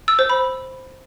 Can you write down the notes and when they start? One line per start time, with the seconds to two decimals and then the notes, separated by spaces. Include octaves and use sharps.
0.08 E6
0.19 C5
0.30 B5